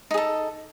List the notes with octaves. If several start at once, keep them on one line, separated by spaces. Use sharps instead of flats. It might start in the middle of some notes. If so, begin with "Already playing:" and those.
D#4 G#4 A4